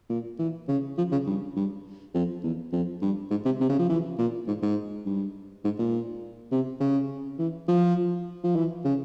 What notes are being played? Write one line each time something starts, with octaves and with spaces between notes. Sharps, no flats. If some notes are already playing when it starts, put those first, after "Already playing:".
A#2
E3
C#3
F3
C#3
G2
G2
F2
E2
F2
G2
G#2
C3
C3
C#3
F3
E3
A#2
G#2
G#2
G2
G#2
A#2
C3
C#3
E3
F3
F3
E3
C#3